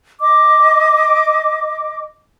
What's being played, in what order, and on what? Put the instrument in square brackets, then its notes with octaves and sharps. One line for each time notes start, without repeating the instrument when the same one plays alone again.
[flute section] D#5 D6